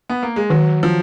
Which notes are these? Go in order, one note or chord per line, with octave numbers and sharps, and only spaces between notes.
B3
A#3
G#3
D#3 F#3
F3